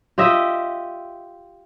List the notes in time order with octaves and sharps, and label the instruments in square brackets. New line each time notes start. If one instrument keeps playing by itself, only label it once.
[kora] F4 G4 D#5 E5